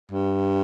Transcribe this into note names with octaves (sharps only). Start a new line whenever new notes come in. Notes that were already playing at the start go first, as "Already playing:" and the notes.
G2